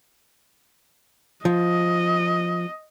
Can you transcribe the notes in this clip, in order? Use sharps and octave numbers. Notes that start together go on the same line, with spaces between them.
F3 D#5